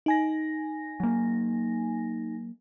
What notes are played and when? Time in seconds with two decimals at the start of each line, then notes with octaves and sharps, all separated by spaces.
0.06 D#4 G#5 A#6
1.00 F#3 A#3